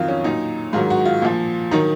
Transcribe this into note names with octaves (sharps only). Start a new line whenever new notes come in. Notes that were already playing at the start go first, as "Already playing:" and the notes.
Already playing: F2 D#3 F#3 F4
C#4
A#2 F#3 D#4
G#2 D#3 F#3 F4
F#4
F4
A#2 F3
D#3 F#3 D#4